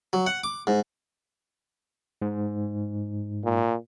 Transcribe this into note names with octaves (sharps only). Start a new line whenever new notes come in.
F#3
F#5
D6
G#2
G#2
A#2